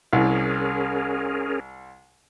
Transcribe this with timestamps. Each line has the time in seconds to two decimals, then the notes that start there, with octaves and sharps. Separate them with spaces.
0.13 C2 C#4 G#4 A#4